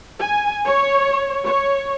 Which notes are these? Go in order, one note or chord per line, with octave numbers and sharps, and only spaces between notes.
G#5
C#5
C#5